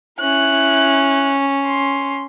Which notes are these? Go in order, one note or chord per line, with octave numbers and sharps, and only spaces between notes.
C#4 E4 F#6
C6